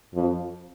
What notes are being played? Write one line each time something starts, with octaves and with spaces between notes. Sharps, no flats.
F2